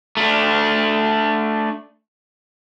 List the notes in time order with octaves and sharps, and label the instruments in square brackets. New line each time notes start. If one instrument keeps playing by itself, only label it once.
[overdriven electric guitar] A3 D4